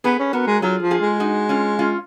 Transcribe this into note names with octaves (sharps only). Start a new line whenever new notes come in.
B3 G#4 B4
C#4
B3 F#4 A#4
G#3
F#3 F4 G#4
F3
F4 G#4
G#3
D#4 F#4
C#4 F4
C#4 F4